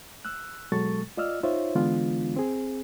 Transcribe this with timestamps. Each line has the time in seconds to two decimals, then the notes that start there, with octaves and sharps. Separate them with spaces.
0.25 E6 F#6
0.72 B2 F#3 G#3 A4 C#6 A6
1.17 F4 D5 D#5 E6 F6
1.43 D#4 F4 C5 C#5 E5
1.75 D3 E3 G#3 B3 D4 F4
2.36 C4 G#4